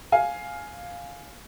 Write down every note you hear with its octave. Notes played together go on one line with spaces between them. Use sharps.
F5 G#5